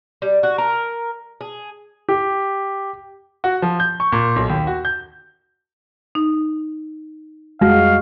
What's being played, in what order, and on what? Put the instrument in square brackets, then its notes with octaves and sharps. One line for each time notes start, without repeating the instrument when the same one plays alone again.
[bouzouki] G3
F#4
A#4
G#4
[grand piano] G4
F#4
F3
G6
C#6
A#2
B1
D#2
F#4
G6
[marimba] D#4
[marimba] F2 G3 [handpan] G#3 F#4 [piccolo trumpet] F5